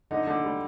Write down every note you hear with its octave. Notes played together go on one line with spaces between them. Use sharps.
D3 D#4
D3
G3